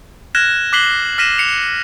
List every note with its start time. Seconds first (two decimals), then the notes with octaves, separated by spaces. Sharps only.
0.35 F6 F#6 G#6 A#6 E7
0.73 D6 F#6 B6 C7 F#7 G7
1.18 F6 A#6 B6 D#7 E7
1.38 C7 C#7 F7